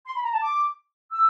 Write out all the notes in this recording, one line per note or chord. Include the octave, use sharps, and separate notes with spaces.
C6
B5
A#5
A5
D6
E6